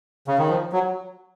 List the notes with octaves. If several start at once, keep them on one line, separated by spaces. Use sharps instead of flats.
C#3
D#3
F3
F#3